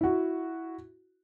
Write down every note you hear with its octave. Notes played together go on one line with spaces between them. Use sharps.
E4 F#4